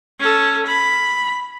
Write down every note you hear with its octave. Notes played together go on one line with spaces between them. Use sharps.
C#4 A4
B5